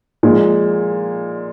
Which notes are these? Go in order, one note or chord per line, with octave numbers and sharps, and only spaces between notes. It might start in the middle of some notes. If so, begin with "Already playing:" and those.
A#2 F3 G#3